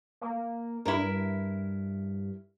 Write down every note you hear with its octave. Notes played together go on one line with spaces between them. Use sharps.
A#3
G2 E4 A#4